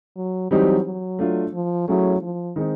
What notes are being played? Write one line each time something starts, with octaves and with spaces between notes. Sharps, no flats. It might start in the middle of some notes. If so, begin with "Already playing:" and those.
F#3
E3 F#3 G3 C4 D#4 G4
F#3
A3 D4 F4
F3
F#3 A3 C#4 E4 G#4
F3
D#3 G#3 C4 D#4